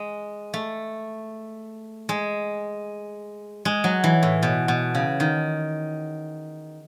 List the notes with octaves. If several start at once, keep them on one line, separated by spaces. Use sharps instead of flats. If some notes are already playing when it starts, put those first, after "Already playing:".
Already playing: G#3
A3
G#3
G#3
F#3
E3
A2
B2
B2
C#3
D#3